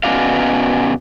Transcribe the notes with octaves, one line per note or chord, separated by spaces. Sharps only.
B2 D#3 C#4 F#4 D5 F5